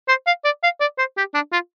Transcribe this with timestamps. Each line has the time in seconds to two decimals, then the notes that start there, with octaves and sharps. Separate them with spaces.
0.08 C5
0.27 F5
0.45 D5
0.63 F5
0.80 D5
0.98 C5
1.17 G4
1.34 D4
1.52 F4